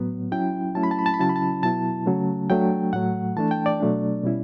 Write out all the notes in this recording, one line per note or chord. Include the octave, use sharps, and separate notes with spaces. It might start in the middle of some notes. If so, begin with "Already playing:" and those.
Already playing: A2 F#3 B3
F#3 C#4 E4 G5
F#3 A3 C#4 E4 A5
B5
A5
B5
A5
B5
C#3 F#3 C#4 E4 A5
B5
A5
B2 F#3 B3 E4 A5
C#3 F#3 A3 C#4
F#3 A3 D4 G5
A2 F#3 A3 F#5
E3 A3 D4 A5
G5
D5
B2 F#3 A3 D4
B2 G3 C#4 E4